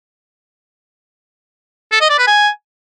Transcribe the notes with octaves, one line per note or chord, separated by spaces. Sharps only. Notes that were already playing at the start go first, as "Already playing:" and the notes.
A4
D#5
D5
B4
G#5